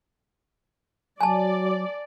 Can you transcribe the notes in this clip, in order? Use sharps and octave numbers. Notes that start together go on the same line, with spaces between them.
F#3 D5 G#5 A5